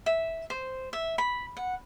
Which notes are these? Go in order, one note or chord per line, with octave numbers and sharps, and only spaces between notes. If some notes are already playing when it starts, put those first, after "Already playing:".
E5
C5
E5
B5
F#5